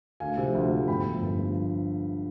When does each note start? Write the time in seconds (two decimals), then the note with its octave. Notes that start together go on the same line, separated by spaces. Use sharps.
0.20 D2 F5 G#5
0.38 C3 F3
0.54 D2
0.71 C3 F3
0.88 G1 G5 B5
1.05 G2 F3
1.22 G1
1.39 G2 F3